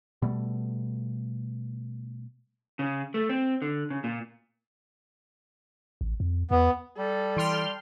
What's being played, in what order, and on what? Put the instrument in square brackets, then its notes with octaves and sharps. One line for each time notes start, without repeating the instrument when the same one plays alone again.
[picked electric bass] B2 G3 A3
[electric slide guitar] C#3
A3
C4
D3
C#3
A#2
[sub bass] A1
F2
[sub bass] E2 [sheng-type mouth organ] B3
[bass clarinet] G3 [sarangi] A4
[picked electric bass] E3 [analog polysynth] G5 C6 F6